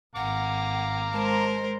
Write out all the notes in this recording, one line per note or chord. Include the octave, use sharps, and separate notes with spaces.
G#1 F5 F#5 A#5 D6
G#3 A#4 C5 A5